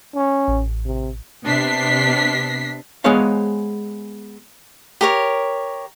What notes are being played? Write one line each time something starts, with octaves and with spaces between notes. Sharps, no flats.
C#4
A1
C3
C3 B3 D4 B6 C7
G#3 B3 G#4 C5 C#5 F5
G4 A#4 C#5